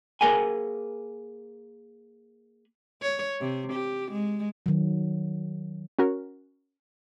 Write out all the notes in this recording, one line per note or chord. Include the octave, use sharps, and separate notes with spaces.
A#3 G#4 A#4 B4 F#5 G#5
C#5
C3
G4
G#3
D#3 F#3
C#4 F#4 A#4